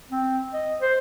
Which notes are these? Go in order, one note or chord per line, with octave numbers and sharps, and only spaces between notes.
C4
D#5
C5